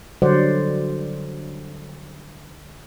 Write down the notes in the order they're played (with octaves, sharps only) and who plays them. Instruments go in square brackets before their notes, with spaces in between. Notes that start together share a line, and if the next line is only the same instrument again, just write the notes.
[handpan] D3 F#3 G3 C5 D5 F#5